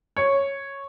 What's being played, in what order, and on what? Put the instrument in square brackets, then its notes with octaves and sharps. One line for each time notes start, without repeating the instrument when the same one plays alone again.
[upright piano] C#5